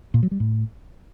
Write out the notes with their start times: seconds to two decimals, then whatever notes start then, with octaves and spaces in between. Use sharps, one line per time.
0.14 A#2
0.23 F#3
0.31 G3
0.40 A2